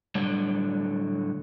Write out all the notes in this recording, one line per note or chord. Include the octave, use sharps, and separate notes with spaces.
A2 D3 F#3 G3